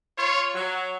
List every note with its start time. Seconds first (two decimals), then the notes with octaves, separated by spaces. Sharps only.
0.16 F4 C#5
0.54 F#3